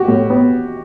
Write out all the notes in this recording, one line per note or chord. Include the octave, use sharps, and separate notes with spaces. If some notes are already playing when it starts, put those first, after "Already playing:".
Already playing: F#4 G4
A2
B3